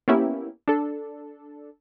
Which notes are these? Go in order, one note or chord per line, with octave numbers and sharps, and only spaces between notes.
A#3 B3 C#4 E4 G4
D4 A4